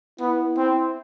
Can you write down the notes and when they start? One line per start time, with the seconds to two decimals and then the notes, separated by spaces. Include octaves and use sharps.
0.19 B3 E4
0.57 C4